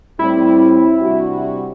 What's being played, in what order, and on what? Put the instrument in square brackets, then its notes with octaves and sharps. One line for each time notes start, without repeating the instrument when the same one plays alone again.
[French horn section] A2 G3 C4 [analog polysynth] E4
[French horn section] C3 G3 D4 F#4